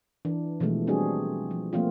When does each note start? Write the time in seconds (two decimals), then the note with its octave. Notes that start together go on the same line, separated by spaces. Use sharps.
0.25 E3 D4
0.60 B2 E3 F3 G#3 A3
0.87 G3 C4 D4 F#4 G#4
1.51 F3
1.73 F3 A3 A#3 C4 F4